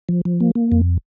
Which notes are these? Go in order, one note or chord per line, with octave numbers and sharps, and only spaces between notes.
F3
F3
A#3
A#3
F2